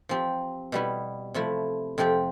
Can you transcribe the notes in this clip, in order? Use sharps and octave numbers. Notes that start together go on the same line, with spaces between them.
F3 C4 G4
B2 G3 B3 E4
C3 F3 A3 E4
F2 C3 F3 C4 G4